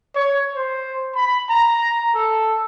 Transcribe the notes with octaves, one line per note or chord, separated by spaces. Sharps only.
C#5
C5
B5
A#5
A4